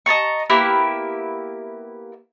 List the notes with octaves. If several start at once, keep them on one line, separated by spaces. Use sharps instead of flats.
D#5 A5 A#5 C#6
A#3 B3 E4 G4